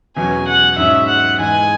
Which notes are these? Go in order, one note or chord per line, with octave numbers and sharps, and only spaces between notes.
E2 B2 F#3 C#4 G#5
F#5
G#2 F#3 C#4 E5
F#5
G#2 E3 G#3 G#5